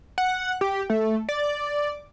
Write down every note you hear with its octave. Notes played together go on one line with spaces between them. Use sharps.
F#5
G4
A3
D5